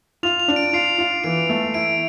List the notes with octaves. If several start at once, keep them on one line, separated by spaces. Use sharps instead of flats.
F4 F7
F7
D4
D7
F4 C7
F4
E3 D7
A3
E4 D7